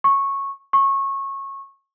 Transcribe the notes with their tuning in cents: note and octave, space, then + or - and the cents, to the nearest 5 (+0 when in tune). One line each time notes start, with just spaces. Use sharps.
C#6 -10
C#6 -20